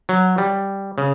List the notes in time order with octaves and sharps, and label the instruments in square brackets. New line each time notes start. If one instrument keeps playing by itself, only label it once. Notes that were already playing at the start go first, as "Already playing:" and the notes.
[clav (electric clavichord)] F#3
G3
C#3